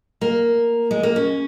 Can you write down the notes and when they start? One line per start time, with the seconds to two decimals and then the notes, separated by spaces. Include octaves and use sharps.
0.21 A#3
0.91 G#3
1.03 A#3
1.16 C#4